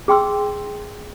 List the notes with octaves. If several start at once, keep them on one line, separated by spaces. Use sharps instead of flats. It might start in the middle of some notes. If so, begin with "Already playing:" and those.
G#4 G5 C6 E6